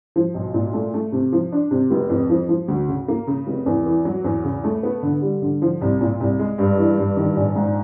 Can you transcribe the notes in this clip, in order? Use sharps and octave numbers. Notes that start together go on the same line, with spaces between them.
F3
B1
A#2
A3
A3
C3
F3
D4
C3
F1
F2
F3
F3
D2
C#3
A#3
C#3
F1
E2
E3
F#3
E2
C#3
A3
B3
D3
G3
D3
F3
C2
A#2
C2
G#3
G2
E3
G2
D#3
A#1
G#2